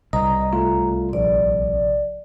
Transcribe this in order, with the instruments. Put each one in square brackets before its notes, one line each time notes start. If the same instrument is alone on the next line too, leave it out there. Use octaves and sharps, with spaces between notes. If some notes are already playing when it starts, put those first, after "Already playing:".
[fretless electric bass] C2 [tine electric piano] D#5 [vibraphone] A#5
[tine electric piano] A3 F4
[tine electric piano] A#1 [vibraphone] D5